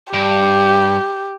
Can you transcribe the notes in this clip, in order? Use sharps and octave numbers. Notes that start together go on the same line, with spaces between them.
G2 G4